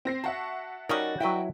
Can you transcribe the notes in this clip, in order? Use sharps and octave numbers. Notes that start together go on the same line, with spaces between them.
C4 A#6 C7
F#4 E5 F#5 A5
G3 C#4 D#4 F#4 A#4 D5 D#5
F#3 E4 B4 D#5 G5